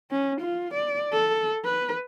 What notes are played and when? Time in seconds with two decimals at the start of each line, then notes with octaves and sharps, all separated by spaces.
0.11 C#4
0.41 F4
0.74 D5
1.13 A4
1.65 B4